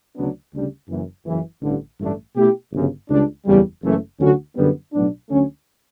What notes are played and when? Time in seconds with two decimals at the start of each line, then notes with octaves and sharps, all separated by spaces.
0.16 D2 C#3 F#3 B3 D4
0.53 D2 C#3 G3 D4
0.88 F#1 F#2 E3
1.25 F#1 F#2 C#3 E3
1.62 A1 G2 D3
2.00 A1 G2 D3 A3 D4
2.36 B2 A3 E4 G4
2.72 G1 F#2 C#3
3.10 C#2 C#3 G3 D4
3.46 F#1 E2 C#3 G3
3.82 F#1 F#2 E3 A3
4.20 D2 D3 F#3 C#4 F#4
4.56 F#2 D3 G3 B3
4.93 B1 A2 F#3 B3 D4
5.29 D2 D3 F#3 A3 C#4